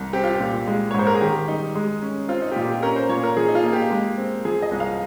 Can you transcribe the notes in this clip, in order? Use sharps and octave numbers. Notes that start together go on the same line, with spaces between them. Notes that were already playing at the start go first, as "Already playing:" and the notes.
Already playing: C2
C4 G4
F4
G4
A#2
G#3
C#5
G#2 C5
A#4
G#4
D#3 G4
G3 D#4
G#3
C#4
C4 F4
D#4
G4
A#2 F4
G4
C#4 A#4
C5
A#2 C#5
A#4
F3 G#4
D#4
F4
A#3
G4
G#3
C4
F3 G#4
D#5
C2
F5